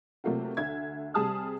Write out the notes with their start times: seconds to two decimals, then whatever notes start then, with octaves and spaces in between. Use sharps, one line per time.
0.24 C3 F#3 A3 A#3 F4 F#4
0.57 D2 E5 G#6
1.14 C3 G3 G#4 A5 D#6 F6